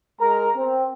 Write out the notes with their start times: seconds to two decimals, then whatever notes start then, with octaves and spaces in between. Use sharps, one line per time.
0.20 G#3 A#4 A#5
0.56 C4